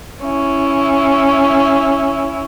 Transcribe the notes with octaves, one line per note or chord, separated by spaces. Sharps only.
C#4 E4